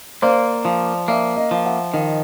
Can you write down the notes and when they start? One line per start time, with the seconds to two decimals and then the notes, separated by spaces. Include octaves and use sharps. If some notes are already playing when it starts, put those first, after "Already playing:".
0.22 A#3 C5 D5
0.65 F3
1.08 A#3 D5 E5
1.36 D#5 F5
1.51 F3
1.65 E5 F#5
1.93 D#3 D#5 F5